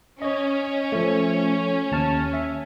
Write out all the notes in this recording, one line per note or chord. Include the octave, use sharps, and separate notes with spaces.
C#4 C#5 D#5
F3 A3
D#2 A5 F6
E5